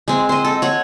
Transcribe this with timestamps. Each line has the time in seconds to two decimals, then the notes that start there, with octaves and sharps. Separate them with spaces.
0.08 G#3 C4
0.29 C5 D#5
0.45 A4
0.62 C#5 F#5